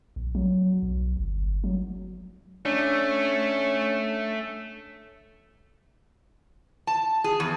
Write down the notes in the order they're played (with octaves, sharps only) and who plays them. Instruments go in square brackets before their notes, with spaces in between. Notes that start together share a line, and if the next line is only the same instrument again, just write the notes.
[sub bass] A#1
F#3
B1
G1
F#3
[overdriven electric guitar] A3 [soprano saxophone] C#4 [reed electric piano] D4
[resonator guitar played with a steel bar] A5
G#4
E2